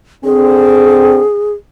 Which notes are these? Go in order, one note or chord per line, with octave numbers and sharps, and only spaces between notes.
D3 C4 G#4